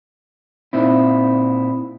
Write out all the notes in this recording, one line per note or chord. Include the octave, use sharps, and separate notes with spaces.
A#2 C4 D#4 E4